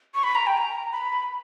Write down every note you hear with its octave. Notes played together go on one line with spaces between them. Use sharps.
C#6
B5
A#5
G5
A#5
B5